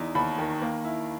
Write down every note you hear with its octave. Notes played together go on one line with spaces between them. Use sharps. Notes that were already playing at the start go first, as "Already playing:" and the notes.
Already playing: E2 D#4
D#2 B5
D#3
A#3
E4